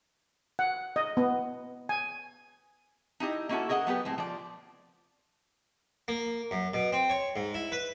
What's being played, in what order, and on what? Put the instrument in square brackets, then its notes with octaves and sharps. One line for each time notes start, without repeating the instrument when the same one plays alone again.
[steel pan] F#5
D#5
B3
G#5
[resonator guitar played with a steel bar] D#4 E4 G4 D#5
A#3 C#4 E4 F#4 A4
G#4 A#4 D#5 F5 F#5
F#3 B3 G4 B4
A2 G#3 C4
F3 D5
[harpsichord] A#3
F#2
B2
C4
C#5
G#2
E4
B4